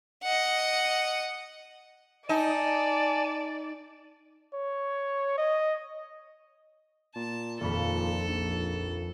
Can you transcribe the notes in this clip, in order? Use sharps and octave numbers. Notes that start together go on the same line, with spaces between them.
D#5 F#5
D#4 D5 G#5 A5
C#5
D#5
A#2 A5
D#1 F2 A#2 A4 B5
A#1